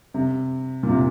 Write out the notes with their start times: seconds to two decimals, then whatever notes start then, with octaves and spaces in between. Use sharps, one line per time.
0.14 C3
0.83 A#2
0.89 C3